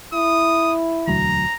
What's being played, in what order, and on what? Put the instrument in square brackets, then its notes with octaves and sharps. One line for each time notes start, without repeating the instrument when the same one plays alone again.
[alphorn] E4 [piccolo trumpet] D#6
[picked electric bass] E1 D2 F#3 [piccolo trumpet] A#5